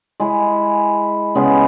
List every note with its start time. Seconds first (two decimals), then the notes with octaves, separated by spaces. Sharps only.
0.20 G#3 E4 G#4
1.35 C#3 G#3 B3